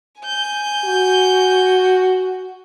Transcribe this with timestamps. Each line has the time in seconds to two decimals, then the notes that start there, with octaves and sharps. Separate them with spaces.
0.22 G#5 G6
0.85 F#4